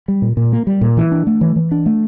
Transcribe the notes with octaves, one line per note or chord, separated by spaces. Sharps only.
G3
A#2
A#2
A#3
G3
A#2
E3
D4
A3
E3
E3
D4
A3